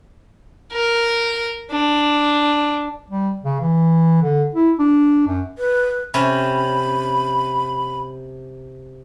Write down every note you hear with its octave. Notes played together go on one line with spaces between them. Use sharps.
A#4
D4
G3
C#3
E3
D3
E4
D4
F#2
B4
C3 C#4 B5